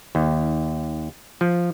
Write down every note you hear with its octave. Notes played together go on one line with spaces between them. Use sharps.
D#2
F3